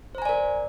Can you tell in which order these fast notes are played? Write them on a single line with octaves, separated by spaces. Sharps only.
C5 A#5 G#5 D5 A#4